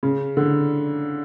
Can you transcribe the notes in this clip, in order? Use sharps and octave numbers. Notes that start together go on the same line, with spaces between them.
C#3
D3